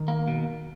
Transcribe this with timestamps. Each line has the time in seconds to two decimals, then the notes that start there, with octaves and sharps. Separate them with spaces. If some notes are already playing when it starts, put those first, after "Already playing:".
Already playing: D#3
0.08 A#3
0.28 B2